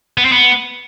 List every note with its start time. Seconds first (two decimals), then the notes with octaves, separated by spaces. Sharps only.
0.18 B3
0.25 C4
0.32 B3